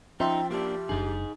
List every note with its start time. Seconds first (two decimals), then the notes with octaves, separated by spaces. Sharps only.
0.20 F3 C#4 D#4 E5 G5 C6
0.51 A#3 D4 G4
0.89 F#1 D4 D#4 G#4